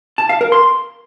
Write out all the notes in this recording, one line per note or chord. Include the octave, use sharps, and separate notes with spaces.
A5
F5
A#4
C6